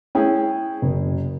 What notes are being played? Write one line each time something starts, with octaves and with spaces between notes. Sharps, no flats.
C#4 E4 G#4 G5
F#1